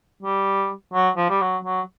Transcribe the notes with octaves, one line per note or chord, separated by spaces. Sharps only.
G3
F#3
F3
G3
F#3
F#3